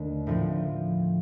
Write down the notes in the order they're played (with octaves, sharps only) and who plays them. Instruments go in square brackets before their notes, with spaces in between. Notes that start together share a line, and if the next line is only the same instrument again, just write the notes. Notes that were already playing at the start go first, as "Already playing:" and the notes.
Already playing: [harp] D#2 D3 A3
A2 F3 C4